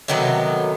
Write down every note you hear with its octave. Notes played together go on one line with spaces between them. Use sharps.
C3 D#3 F#3 G3 A3 B3